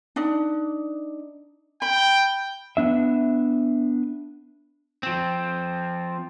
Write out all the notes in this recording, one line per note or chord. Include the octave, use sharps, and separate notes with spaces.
D4 D#4
G5 B5
B3 D4 E5
F3 C4